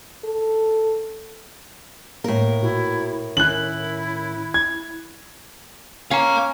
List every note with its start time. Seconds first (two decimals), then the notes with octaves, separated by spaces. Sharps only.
0.24 A4
2.24 A2 A#3 A#4
2.62 A#2 E4 F#4
3.37 D#3 C#4 E4 F#6 F#7
4.54 G#6
6.11 C#4 F5 A#5